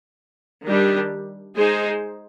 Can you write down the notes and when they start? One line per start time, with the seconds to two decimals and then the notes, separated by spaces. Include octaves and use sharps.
0.66 D#3 G3 D4 G4
1.56 G#3 D#4 G#4 C5